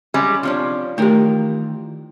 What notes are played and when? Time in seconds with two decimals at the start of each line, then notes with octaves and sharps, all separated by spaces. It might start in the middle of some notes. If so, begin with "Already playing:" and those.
0.14 G3 G#3 C#4
0.43 C3 F3 C#4 D4
0.98 D#3 E3 A3 G4 A#4